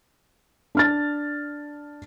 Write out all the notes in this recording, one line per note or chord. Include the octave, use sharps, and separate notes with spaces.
D4 F6 A6